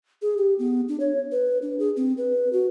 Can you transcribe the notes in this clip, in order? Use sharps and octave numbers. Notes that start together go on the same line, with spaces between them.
G#4
G4
B3
D4
C#5
B4
D4
G#4
C4
B4
F#4